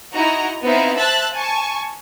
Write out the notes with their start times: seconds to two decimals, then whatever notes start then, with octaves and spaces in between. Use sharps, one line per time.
0.12 D#4 E4 F#4 D#5 A#5
0.64 B3 C4 D#4 E4 E5 F5
0.97 C5 E5 A5 E6 F#6 A6
1.34 G#5 A5 C#6